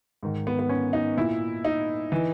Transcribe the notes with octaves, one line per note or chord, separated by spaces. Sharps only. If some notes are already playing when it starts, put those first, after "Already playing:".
G#2 D#3
B3
B3
C#4
D#4
A#2 E4
D#4
E3